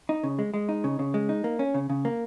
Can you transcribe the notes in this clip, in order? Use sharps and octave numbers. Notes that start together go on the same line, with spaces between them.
D#4
C#3
G#3
G#3
D#4
C#3
C#3
G#3
D#4
A#3
C#4
C#3
C#3
A#3